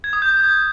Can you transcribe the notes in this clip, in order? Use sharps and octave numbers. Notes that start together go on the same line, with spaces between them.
G#6
D#6
G6